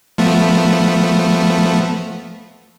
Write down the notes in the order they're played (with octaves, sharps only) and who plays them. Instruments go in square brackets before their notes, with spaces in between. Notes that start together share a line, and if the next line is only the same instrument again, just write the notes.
[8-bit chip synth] F3 A3 B3